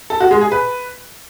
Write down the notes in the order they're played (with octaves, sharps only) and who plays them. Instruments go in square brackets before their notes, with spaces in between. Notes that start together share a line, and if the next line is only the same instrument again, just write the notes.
[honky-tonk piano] A4
F#4
G#3
G#4
B4